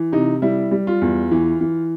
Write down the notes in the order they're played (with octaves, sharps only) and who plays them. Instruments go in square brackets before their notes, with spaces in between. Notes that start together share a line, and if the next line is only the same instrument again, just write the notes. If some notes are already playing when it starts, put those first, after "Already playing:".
Already playing: [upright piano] E3
C3 D#4
G3 E4
G3
F4
E2
E3
E3